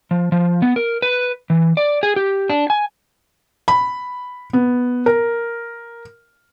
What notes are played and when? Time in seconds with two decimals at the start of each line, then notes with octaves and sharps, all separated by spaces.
0.11 F3
0.32 F3
0.62 B3
0.76 A#4
1.02 B4
1.50 E3
1.77 D5
2.03 G#4
2.16 G4
2.50 D4
2.70 G#5
3.68 B5
4.53 B3
5.06 A#4